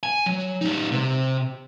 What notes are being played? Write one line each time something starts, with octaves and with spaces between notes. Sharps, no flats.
G#5
F#3
G3 D#4
C3